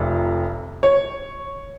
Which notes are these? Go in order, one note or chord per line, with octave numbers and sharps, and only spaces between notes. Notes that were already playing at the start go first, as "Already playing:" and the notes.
Already playing: F1 F2 C3
C#5